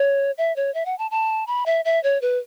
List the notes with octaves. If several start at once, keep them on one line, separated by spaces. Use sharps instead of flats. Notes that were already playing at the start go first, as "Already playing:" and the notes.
Already playing: C#5
E5
C#5
E5
F#5
A5
A5
B5
E5
E5
C#5
B4